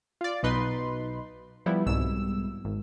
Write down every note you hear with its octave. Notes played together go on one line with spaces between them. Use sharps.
F4 D5
B1 B2 D#4 B4 C6
F3 G3 B3 E4
C2 G#2 B2 E6
G#1